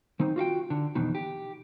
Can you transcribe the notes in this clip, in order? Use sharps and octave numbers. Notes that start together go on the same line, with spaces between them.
D#3 C4 D#4
F4 F#4 F5 G5
D3
F2 B2 D#3 E3
G4